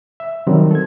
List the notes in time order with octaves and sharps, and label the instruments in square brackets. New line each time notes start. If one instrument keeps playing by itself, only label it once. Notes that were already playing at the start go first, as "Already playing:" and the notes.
[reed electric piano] E5
C3 D#3 F#3 G3 C4
A4 G#6